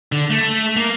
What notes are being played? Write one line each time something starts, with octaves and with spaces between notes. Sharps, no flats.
D3
A3
A#3